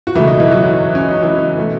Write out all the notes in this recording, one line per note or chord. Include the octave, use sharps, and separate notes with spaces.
F#4
C#2 B2 E3 A3 E4
D#4
E3 E4
F#3 F#4
C#4
D#4
E3 E4
B2 A3